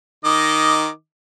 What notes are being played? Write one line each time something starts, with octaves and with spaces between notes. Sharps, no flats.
D#3 D#5 D6